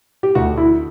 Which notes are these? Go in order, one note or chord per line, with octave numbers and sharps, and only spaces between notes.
G4
D2 F#4
E4